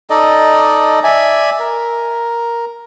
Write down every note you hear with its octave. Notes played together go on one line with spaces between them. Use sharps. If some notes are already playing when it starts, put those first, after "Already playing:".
D#4 A4 D5 D#5
D5 E5 G#5
A#4